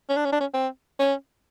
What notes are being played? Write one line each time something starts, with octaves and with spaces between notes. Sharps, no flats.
C#4
D4
C#4
D4
C#4
C4
C#4